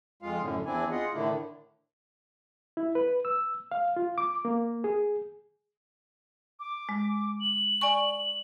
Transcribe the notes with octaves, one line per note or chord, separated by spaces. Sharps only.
F2 G#3 F4 F5
F#2 A2 D3
E2 C4 D4 E4 G#5
F4 G#4 D#5 F#5
A2 D3 D#3 A3 D4 E4
E4
B4
E6
F5
F4
D6
A#3
G#4
D6
G#3
F#7
D5 G#5 C#6